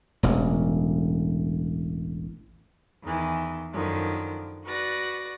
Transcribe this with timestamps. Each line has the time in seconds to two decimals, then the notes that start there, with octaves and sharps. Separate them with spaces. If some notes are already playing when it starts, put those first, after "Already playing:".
0.23 E1 A1
3.03 E2 D#3 E3
3.72 F#2 D3 D#3 F3
4.65 F#4 B4 D5 A#6